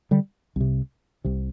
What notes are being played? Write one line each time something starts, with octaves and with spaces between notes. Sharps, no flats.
D3 G3
C2 C3
C2 C3